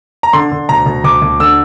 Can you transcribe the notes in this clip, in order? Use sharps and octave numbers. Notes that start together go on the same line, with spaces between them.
A#5
D3 C6
D3
D2 A#5
D2
D2 D6
D2
D3 E6